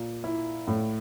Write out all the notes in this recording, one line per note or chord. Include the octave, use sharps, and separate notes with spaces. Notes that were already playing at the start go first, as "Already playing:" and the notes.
Already playing: A#2
E4
A2